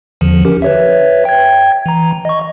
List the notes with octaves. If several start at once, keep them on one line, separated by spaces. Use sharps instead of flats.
E2 D3 F3
C#4 G4 A#4
B4 C#5 E5
G5 G#6
E3 A#5
D#5 C#6